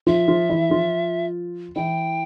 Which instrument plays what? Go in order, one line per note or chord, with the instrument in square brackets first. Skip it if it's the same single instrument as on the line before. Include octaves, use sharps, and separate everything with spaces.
[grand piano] F3 F4 [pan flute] E5
[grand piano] F3 F4
E3 E4
F3 F4
[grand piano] E3 E4 [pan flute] G5